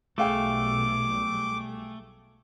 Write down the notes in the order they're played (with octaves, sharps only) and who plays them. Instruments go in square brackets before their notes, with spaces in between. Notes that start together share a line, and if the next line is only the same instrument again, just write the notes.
[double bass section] B1 G3 [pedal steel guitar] A3 [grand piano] G#4 F5 G5 [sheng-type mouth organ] D6